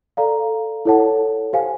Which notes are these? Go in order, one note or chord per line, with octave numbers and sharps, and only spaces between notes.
A4 D5 F5 A#5
E4 A4 C#5 F#5 A5
G4 C5 F5 G#5